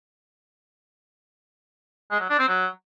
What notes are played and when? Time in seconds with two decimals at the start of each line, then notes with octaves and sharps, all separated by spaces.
2.11 G#3
2.20 F#3
2.30 D4
2.39 C4
2.48 F#3